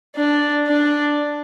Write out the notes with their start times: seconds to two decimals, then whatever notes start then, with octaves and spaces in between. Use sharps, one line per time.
0.16 D4
0.67 D4